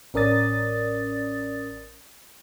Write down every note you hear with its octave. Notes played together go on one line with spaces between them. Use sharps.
A1 C#4 A#4 D5 D#6 A6